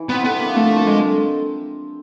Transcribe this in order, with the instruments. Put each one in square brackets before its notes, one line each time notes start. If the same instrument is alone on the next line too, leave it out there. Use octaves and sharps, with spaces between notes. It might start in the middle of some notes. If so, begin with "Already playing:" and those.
Already playing: [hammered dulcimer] E3
[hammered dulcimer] G3 C4 [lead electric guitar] B3
[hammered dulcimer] D3 [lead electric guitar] B3
[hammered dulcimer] F3 A#3
[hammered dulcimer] D3 [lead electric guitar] A3
[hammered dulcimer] F3 A#3
[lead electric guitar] G#3